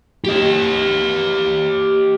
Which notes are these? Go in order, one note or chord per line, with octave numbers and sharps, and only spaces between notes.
G4 D#5